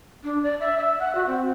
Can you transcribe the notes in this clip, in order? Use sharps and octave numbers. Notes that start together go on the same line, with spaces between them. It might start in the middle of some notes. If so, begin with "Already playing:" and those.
D4
D5
E5
E5
F#5
F#4
C4